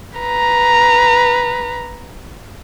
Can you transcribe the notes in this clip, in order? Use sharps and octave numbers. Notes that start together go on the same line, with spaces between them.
B4 A#5